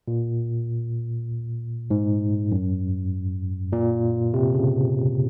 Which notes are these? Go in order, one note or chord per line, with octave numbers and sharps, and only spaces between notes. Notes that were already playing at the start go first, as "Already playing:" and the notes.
A#2
G#2
F#2
A#2
C3
C#3